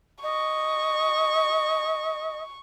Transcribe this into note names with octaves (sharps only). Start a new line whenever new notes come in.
D#5 C#6